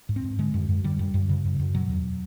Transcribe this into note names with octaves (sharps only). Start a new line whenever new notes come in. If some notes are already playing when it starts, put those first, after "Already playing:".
G#2
C4
G#2
D3 G#3
F#2
F#2
D3 G3
F#2
F#2
C#3
F#2
F#2
B2 F#3
E2